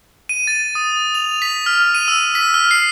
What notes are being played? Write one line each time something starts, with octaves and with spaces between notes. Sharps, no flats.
D#7
A6
D#6
F7
B6
F6
D#7
E6
B6
F6
C7